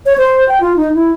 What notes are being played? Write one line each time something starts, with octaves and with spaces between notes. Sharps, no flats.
C#5
C5
G5
F4
D#4
E4